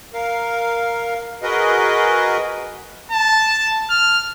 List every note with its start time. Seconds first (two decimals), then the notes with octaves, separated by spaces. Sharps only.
0.14 A#4 F5
1.43 F#4 G#4 A#4 B4 D#5
3.12 A5
3.90 F6